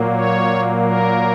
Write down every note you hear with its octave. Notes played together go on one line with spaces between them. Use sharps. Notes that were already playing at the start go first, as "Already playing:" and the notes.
Already playing: A#2 F#3 A#3
C#5
A#4